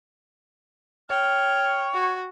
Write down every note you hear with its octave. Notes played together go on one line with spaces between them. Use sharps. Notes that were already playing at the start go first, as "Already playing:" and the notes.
C#5 G5 F6
F#4